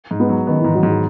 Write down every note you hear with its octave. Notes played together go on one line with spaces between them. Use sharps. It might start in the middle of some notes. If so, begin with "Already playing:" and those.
G#2
G#3 B3
F#3
D#3 B3
G#2 E3
F#3
G#2
G#3